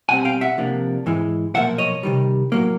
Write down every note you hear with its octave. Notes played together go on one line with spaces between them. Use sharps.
B2 G3 C4 F#5 G#5
F5 G5
E5 F#5
C3 F3 A#3 D4
G#2 E3 G#3
B1 A#2 F3 A#3 E5 F#5
C#5 D#5
C3 D#3 G3
A2 F#3 A#3